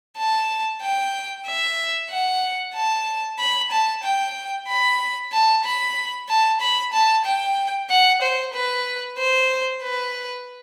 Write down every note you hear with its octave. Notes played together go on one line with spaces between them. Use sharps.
A5
G5
E5
F#5
A5
B5
A5
G5
B5
A5
B5
A5
B5
A5
G5
F#5
C5
B4
C5
B4